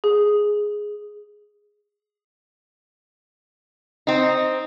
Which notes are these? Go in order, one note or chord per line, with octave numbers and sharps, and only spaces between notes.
G#4
C4 D#4